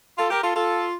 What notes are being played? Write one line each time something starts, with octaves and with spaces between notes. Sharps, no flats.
F4 A4
G4 A#4
F4 A4
F4 A4